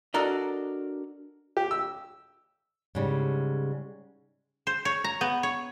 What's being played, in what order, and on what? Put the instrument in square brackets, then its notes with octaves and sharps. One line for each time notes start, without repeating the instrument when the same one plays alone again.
[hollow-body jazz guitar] D4 F#4 A4 A#4 D#5
[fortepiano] G4
E6
[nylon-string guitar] G#2 C#3 G3
[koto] C5
C#5
A#5
B3
C#5